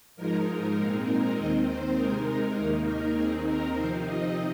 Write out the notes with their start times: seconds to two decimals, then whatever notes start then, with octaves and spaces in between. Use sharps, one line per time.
0.16 G#2 F3 G#3 D#4 A#4
0.76 A#2 G#3 C4 D#4 A#4
1.06 A#4
1.36 D#2 D#3 C4 D#5
1.66 C5
1.96 C3 G#3 D#4 A#4
2.56 D#2 D#3 A#3 D#4 A#4
2.86 A#4
3.16 D#2 D#3 C4 D#4 G#4
3.46 A#4
3.76 C3 F3 C4 D#4 C5
4.06 D#5